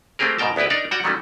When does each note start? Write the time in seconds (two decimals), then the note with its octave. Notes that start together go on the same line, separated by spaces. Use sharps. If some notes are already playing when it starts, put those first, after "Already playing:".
0.19 A3 A#3 C4 G4 G#4 A#4
0.39 G#2 B2 A#4 G5 A5
0.56 D2 B3 E4 G4 B4
0.70 D4 D#4 A#4 D5
0.91 G3 F#4 C#5 F#5 G5
1.04 D#3 F#3 G3 A3 C#4